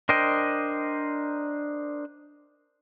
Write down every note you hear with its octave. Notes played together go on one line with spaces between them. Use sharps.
D4 A#4 C5 D#5 G5